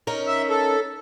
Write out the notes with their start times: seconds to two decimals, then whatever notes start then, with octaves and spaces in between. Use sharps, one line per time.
0.07 C#4 D#4 A#4
0.27 E5
0.49 A4